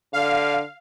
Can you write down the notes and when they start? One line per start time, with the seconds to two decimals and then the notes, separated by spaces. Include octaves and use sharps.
0.13 D3 F5